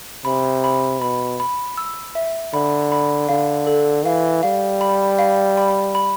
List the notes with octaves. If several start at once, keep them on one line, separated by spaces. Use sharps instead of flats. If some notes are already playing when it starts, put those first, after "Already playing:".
C3 B5
B5
B2 B5
B5
E6
E5
D3 B5
B5
D3 F5
A4
E3 F5
G3 F5
B5
F5
B5
B5